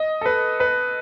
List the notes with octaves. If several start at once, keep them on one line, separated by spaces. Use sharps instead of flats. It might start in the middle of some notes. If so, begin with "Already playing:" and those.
Already playing: D#5
A4
B4
B4